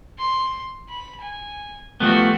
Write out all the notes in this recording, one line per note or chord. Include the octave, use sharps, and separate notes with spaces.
C6
B5
G#5
F3 A3 B3 F#4 G4